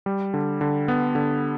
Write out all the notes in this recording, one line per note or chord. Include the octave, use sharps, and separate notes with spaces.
G3
D3
D3
B3
D3